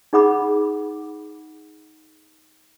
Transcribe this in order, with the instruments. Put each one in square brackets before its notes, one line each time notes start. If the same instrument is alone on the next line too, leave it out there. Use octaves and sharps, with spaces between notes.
[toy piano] D#4 G#4 F#5 B5 D6